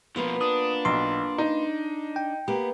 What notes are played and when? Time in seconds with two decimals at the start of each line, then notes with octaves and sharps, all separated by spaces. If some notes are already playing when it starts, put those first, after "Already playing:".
0.16 B2 F3 A#3 B3 F4
0.41 D4 D#6
0.85 B1 C6
1.38 D#4
2.16 G5
2.48 A#3 B3 G4